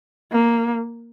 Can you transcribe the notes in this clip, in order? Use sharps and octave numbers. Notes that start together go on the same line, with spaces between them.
A#3